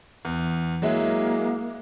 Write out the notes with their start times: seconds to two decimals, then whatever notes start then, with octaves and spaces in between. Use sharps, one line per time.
0.25 E2
0.82 F#3 G#3 A#3 E4